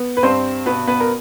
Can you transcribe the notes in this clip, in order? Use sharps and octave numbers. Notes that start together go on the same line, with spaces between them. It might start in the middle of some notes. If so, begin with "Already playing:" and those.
Already playing: B3
B4
G2 C4 C5
B2 B3 B4
B3 B4
A#4